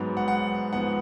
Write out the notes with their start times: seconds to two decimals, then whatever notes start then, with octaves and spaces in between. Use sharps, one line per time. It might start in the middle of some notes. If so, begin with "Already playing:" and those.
Already playing: G#2 F#3 B3
0.17 F#5
0.28 F#5
0.73 G#2 F3 B3 F#5